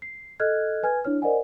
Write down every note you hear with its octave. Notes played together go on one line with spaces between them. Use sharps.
C7
A4 D#5 F6 F#6 G#6
B4 G#5 F6 G#6
D4 E4 C#5 F6
A#4 C5 D5 D#5 F#5 G#5